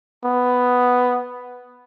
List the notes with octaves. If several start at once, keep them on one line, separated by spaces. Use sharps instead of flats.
B3